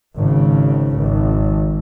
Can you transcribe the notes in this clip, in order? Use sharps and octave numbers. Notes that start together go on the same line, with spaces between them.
G#1 C#3
G#1